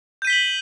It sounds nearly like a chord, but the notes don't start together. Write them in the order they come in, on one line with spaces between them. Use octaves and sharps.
G6 D#7 B6 G7 F#7